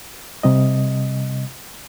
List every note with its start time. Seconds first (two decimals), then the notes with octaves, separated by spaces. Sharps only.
0.43 C3 G3 D#5